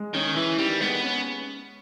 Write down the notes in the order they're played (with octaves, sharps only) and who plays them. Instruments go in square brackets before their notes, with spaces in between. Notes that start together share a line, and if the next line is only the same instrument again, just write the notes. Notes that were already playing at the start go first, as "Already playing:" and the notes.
Already playing: [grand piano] G#3
[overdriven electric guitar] D#3 [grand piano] C#4
[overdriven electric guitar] E3 [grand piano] E4
[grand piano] D#3 [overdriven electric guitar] G3
[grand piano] G#3 [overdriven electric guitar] B3
[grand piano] C#4